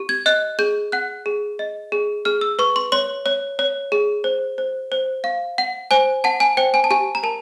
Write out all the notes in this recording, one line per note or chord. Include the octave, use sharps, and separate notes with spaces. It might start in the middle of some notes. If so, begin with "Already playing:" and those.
Already playing: G4
G#6
D#5 F#6
G#4 G6
F#5 F#6
G#4
D#5
G#4
G#4 F6
E6
B4 C#6
C6
C#5 C6
C#5
C#5
G#4
C5
C5
C5
F5
F#5
C5 G#5
F#5 A5
G#5
C5 G5
G#5
A5
G4 G#5
A#5
A#4 A5